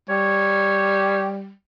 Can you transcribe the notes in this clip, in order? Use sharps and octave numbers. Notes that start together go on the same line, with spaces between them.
G3 C#5